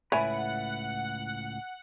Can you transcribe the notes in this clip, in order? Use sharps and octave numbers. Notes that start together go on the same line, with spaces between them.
C#2 A2 E4 B4 C#5 F#5 G#5